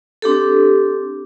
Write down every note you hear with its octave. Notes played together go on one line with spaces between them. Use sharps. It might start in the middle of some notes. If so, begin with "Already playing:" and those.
C4 D4 G4 A4